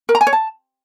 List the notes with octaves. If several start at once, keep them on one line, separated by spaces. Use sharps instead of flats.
A#4
A#5
G#5
C#5
A5